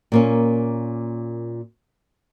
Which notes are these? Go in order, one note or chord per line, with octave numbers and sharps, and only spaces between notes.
A#2 A#3 C#4